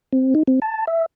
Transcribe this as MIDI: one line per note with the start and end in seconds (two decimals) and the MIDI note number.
0.13 0.34 60
0.35 0.43 63
0.47 0.60 60
0.62 0.85 81
0.87 1.06 76